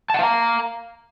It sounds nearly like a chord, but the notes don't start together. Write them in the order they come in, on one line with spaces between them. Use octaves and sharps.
A5 F#5 F5 A#5